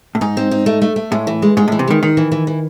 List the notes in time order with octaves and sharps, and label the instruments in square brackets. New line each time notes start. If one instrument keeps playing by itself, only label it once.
[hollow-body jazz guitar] A2
[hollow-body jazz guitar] G#2 [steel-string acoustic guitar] D#4
[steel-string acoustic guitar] C4
D#4
A3
A3
A3
[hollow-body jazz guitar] A2 [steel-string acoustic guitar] G#3
[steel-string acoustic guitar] E3
G#3
[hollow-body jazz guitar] G#2 [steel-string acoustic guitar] G#3
[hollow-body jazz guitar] A2
[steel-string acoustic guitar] E3
[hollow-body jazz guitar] C3
[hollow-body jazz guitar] D#3 [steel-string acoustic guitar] G#3
[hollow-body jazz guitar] D#3 [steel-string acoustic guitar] D#4
[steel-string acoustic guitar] E3
E3
E3